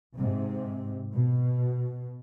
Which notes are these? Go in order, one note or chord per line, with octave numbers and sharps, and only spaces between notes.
G#2 C3
B2